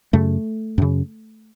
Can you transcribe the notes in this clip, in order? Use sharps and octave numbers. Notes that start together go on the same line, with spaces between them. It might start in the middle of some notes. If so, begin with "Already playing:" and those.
F#2 C#3 A3
F#2 C#3